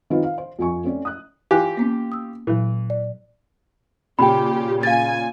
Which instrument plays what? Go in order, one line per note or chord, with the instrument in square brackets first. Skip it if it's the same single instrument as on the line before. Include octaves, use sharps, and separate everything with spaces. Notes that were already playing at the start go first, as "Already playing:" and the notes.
[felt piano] D#3 C4 D#4 F4 B4
F5
C5
F2 F4 G#5 C#6
A3 C4 C#4 D5
D#6 F#6
[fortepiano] E3 F4 G4 [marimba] G#5 F#6
[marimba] A#3 B3 C#4
D#6 E6
[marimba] A#2 F#3 [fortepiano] E3
[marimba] D5
[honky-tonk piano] A#2 C#3 [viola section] G4 [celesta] G5 B5
[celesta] F5 A6 [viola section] G#5